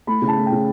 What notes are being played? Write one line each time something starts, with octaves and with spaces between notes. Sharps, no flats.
A3 B5
C#3
A5
A3
G5
C#3